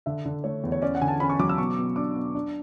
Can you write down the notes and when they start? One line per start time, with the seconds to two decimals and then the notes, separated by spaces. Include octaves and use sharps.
0.06 D3 E5
0.26 D3
0.44 A3 C#5
0.64 E2
0.72 C#5
0.82 C#4 D5
0.95 F#5
1.02 D3 G#5
1.08 A5
1.20 C#4 B5
1.30 C#6
1.39 F#3 D6
1.49 E6
1.58 B2 C#6
1.78 B2
1.96 D4 D6
2.15 B2
2.35 D4